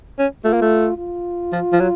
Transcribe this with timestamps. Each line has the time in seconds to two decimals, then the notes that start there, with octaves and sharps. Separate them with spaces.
0.18 C#4
0.44 A3 F4
0.53 A#3
0.61 A3
0.98 F4
1.52 F3
1.72 F3
1.80 F#3